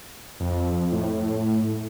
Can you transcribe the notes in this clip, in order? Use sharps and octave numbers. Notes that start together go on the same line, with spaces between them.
F2
A2